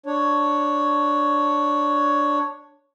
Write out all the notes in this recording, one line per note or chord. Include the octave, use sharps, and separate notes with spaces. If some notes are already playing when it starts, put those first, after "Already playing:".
D4 C#5